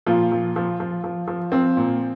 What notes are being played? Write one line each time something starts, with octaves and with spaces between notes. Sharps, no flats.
A#2 F3 F4
F3
F3
F3
F3
F3
F3 C4
A#2